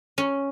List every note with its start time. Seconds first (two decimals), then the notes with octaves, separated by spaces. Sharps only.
0.18 C#4